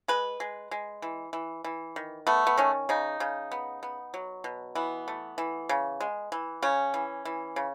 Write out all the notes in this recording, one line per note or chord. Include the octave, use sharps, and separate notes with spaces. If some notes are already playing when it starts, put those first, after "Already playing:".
G#3 B4
G#3
G#3
E3
E3
E3
D#3
A3 B3
B3
D#3 C#4
C#3 D#4
C#3
B3
B3
F#3
B2
E3 B3
A3
E3
C#3
G#3
E3
C#3 C#4
E3
E3
C#3